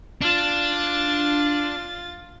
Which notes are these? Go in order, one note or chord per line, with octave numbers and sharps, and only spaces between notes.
D4 F4 A6